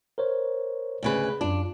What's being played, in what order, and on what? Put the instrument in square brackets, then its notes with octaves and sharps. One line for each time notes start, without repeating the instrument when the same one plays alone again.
[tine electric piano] A#4 C5 C#5
[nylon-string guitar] D2 C#3 B4
[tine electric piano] F#2 F4 [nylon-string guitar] D4